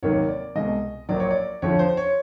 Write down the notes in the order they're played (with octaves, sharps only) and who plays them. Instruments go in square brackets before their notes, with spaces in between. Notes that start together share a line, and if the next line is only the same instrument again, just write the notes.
[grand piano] F1 D#2 D#3 F#3 A#3 C#5
D5
C2 B2 G#3 D#5
A#1 A#2 F#3 D5
C#5
D5
F2 D3 F3 C#5
C5
C#5